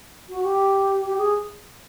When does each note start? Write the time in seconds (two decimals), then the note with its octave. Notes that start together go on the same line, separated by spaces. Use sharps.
0.29 F#4
0.43 G4
1.05 G4
1.17 G#4